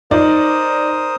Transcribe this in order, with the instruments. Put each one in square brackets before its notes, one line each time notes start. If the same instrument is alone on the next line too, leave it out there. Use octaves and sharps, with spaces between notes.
[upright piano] D#4 D5 [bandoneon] A#4 C5 D#6